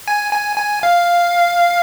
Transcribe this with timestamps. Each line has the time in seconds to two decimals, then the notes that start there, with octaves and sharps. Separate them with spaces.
0.08 G#5
0.33 G#5
0.57 G#5
0.83 F5